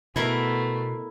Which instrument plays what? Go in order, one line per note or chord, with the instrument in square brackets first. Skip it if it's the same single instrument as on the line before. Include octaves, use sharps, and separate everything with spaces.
[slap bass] B2 [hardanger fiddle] A3 B3 [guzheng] E4 A#4